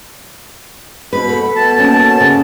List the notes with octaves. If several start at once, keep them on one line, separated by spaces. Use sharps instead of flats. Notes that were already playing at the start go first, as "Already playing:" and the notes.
B2 B4 B5
A3 B3
B2 A5
A3 A#3 C#4
C#3